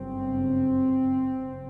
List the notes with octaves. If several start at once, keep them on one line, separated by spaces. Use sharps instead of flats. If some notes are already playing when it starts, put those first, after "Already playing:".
Already playing: G1 F#2 C#3 C4
G1 F#2 C#3